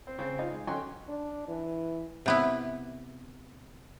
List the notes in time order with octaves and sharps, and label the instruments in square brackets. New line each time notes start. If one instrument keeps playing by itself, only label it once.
[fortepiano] C4
C#3 C4
D#4 F4
G#3
D3 F#3 C#4 D#5 G5 C6
[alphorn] D4
E3
[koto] C3 B3 E4